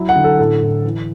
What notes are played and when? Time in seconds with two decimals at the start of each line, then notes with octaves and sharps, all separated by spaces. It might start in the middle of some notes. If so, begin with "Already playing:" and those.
Already playing: F#3 E4
0.09 F#5
0.16 D3
0.24 A4
0.39 A2 A4
0.61 A2
0.85 E3